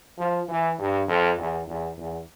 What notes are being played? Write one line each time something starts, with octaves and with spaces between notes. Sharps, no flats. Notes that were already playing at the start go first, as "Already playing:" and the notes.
F3
E3
G2
F2
E2
E2
E2